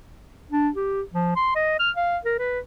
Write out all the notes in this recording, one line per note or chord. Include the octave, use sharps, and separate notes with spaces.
D4
G4
F3
C6
D#5
F6
F5
A#4
B4